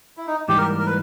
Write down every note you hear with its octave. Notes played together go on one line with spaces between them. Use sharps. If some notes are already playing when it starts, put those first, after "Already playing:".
E4
D#4
G#2 E3 G3 A#3 D#4 G4
A#4
A#4
B4